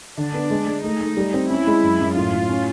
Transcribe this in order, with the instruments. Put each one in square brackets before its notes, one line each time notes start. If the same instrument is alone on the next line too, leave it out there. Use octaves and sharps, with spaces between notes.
[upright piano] D3 [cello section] D4
[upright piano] B3
G#3
G#3
[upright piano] A3 [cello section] D#4
[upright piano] A3
G3
C4
[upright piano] C#4 [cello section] E4
[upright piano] G#3
F#2
F#2
[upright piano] A2 [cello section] F4
[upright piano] A2
C#4